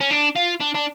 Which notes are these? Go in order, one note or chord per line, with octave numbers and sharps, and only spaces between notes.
C#4
D4
F4
D4
D4